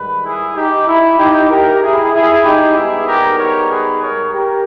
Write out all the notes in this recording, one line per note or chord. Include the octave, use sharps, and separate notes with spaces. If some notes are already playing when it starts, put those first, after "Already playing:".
Already playing: G#2 D#3 G3 B4
E4 G#4
D#4 G4
E4
D#4 G4
G4 A#4
E4 G#4
E4 G#4
D#4 G4
G#2 G3 B3 D#4 E4 G#4
G4 A#4
A#4 C#5
G#4 B4
A#4 C#5
G4 A#4